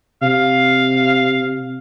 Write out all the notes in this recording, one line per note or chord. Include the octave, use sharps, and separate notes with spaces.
C3 F5